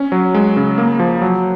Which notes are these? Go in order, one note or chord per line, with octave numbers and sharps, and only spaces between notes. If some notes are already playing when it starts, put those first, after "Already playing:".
Already playing: C#4
F#3
G#3
C#3
A#3
F3
F#3